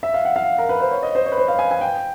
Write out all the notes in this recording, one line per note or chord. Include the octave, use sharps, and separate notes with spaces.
E5
F5
F#5
F5
A#4
B4
C5
C#5
D#5
C5
C#5
B4
C5
F5
G#5
G#5
G5